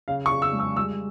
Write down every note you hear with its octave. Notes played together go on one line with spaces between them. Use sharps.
C#3 F5
C#6
C#3
E6
G#3
E6
G3 E6